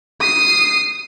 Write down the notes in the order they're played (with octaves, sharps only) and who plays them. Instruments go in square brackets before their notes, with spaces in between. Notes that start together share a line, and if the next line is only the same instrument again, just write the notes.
[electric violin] D#6 C7